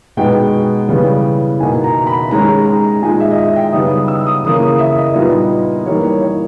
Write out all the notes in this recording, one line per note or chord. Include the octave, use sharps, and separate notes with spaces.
B2 G#3 B3 D#4 G5
C#3 E3 G3 B3
B2 A#3 D#4 G#5
A#5
B5
D#3 G#3 C#4 A#5
A#5
A#2 G#3 D#4 G#5
E5
D#5
E5
G5
C#3 G3 B3 D#4 D#6
D#6
E6
D#6
C#3 E3 A#3 C#4 D#6
D#6
E5
D#5
A#2 G3 B3 D#4
E3 G3 A#3 D#4 C#5
C#5
C#5